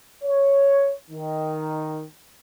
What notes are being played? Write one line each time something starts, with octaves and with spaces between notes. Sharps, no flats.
C#5
D#3